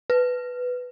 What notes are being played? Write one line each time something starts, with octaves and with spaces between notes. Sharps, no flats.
B4